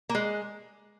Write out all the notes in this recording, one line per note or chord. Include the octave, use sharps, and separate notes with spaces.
A#3
G#3